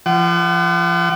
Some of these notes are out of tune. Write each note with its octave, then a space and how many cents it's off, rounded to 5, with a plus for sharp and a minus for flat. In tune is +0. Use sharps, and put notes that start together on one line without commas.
F3 -30 F#5 +35